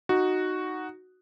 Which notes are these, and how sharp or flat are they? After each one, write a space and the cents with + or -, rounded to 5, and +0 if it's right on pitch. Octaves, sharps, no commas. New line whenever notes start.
D#4 +0 F#4 +0